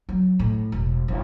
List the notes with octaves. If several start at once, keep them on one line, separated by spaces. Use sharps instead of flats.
F#3
A2
E1
G1